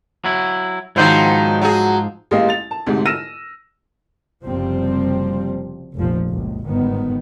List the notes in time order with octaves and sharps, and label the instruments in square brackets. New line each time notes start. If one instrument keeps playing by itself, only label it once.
[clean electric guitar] F#3 E4
[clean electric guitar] G#2 F3 C5 [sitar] D#3 F#3 E4
[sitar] F#3 G#4
[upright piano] A1 G#3 A#3 G4 D#5 F5
A6 F7
A5
D2 G#2 C3 G#3
E6 F6 A#6 D#7 E7
[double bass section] F#1 C3 F3 G3 C4
F1 A#1 F3
F#1 C#2
G1 G#2 D#3 B3